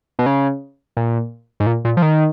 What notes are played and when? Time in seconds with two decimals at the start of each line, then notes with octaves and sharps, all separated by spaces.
0.19 B2
0.26 C#3
0.97 A#2
1.60 G#2
1.66 A#2
1.85 A#2
1.97 F3
2.02 D#3